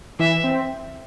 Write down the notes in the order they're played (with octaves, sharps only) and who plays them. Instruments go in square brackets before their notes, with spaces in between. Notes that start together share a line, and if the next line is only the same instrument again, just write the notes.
[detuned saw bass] E3 [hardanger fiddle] E5
[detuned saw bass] C4